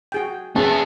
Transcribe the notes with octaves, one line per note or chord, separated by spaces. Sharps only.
F#4 G#4 G5
B3 C#4 G#4 A5